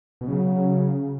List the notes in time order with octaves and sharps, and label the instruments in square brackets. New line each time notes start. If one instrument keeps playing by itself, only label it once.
[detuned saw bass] B2
[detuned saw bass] C#3 [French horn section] F#3